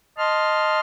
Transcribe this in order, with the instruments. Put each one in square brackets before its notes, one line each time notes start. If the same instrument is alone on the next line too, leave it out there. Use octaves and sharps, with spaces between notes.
[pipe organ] D#5 A5 C6 F6